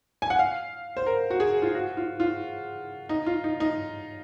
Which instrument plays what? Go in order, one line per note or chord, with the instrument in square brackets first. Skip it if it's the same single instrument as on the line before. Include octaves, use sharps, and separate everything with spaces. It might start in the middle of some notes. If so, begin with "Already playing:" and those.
[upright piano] G#5
F#5
F5
C5
A#4
F#4
G#4
F4
F#4
F4
F4
D#4
F4
D#4
D#4